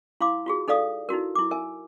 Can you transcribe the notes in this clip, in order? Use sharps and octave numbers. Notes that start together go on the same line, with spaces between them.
E4 F5 C6 D6
F4 F#4 G#4
D#4 A4 D5 F5 D#6
D#4 E4 F#4 A#4
E4 D6
A#4 E5 G#5